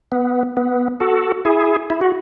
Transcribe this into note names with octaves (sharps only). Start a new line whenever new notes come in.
B3
B3
F#4 A4
E4 G#4
E4
F#4